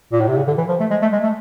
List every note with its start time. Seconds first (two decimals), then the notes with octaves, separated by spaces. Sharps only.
0.12 A#2
0.20 A2
0.28 C3
0.36 C#3
0.47 D3
0.58 E3
0.69 F3
0.80 A3
0.90 G#3
1.02 A3
1.12 G#3
1.23 A3